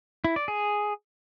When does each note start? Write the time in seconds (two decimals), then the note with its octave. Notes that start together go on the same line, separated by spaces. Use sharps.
0.24 E4
0.36 D5
0.48 G#4